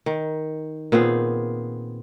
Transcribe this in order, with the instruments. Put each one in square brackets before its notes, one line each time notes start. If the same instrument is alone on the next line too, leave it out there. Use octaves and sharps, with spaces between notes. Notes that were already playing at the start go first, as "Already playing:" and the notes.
[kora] D#3
A#2 B3 C4 G#4